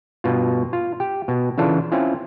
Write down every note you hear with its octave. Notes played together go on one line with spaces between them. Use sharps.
G2 B2 F4
F4
G4
B2
C#3 E3 D4 F4 A4
C4 C#4 E4 F4